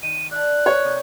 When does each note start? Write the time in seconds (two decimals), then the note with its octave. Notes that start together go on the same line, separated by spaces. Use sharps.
0.03 D#3 D#7
0.31 D5 E5 A5 F#6
0.66 C#5
0.85 C3 D#5 G6